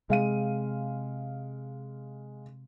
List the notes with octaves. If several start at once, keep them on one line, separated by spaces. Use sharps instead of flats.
C3 G#3 F5 D#7